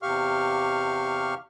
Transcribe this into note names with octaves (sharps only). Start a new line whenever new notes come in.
E2 C3 G4 F5 C#6 F6